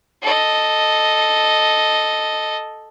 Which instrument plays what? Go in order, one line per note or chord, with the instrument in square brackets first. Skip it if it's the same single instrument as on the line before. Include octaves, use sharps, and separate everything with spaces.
[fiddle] A4 D#5